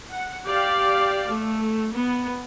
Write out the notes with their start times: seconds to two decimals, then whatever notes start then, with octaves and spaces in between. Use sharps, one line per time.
0.11 F#5
0.45 G4 D5 F5
1.31 A3
1.93 B3